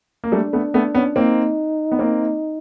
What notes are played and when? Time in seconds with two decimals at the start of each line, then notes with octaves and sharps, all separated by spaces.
0.24 A#3
0.32 G3 A3 D4
0.53 A3 B3
0.74 A3 B3
0.95 B3 C#4
1.16 A#3 C4 D#4
1.92 B3
1.99 A#3 C4